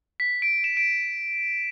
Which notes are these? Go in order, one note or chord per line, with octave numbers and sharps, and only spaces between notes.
B6
D7
E7
D7